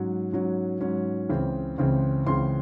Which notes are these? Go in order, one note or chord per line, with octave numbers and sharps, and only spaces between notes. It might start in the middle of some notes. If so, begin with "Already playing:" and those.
Already playing: G#2 F#3 C#4
G#2 F#3 C#4
G#2 F#3 C#4
C#2 C#3 E3 C4
C#2 C#3 E3 C4
C#2 C#3 E3 C4 C6